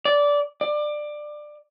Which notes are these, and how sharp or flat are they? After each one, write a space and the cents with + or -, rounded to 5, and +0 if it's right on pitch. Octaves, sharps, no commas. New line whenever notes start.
D5 -15
D5 +20